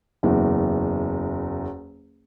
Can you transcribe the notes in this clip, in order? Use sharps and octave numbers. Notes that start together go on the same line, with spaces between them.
F#1 E2